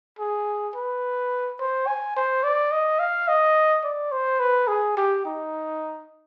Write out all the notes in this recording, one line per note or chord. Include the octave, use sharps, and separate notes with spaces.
G#4
B4
C5
G#5
C5
D5
D#5
F5
D#5
D5
C5
B4
G#4
G4
D#4